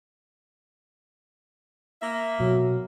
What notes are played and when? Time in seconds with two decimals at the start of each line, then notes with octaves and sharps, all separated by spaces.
2.02 A#3 E5
2.40 B2 F#3